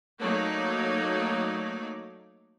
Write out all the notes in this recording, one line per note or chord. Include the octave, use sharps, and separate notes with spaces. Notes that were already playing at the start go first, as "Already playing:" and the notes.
F#3 A3 A#3 D#4 C#5 D5